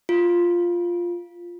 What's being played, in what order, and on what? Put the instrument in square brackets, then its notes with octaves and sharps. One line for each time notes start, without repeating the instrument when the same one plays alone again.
[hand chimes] F4